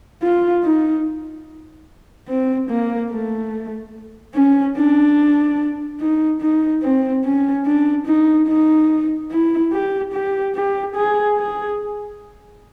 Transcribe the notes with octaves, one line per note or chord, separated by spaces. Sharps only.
F4
D#4
C4
A#3
A3
C#4
D4
D#4
D#4
C4
C#4
D4
D#4
D#4
E4
G4
G4
G4
G#4
G#4